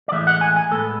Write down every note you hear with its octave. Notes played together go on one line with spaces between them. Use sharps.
D5
A2 E3 G#3 E5
F#5
G#5
G#5
A2 G#3 B3 A4